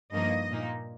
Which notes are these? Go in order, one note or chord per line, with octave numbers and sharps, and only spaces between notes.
G2 F3 A#3 D#4 D#5
A#2 A#3 D#4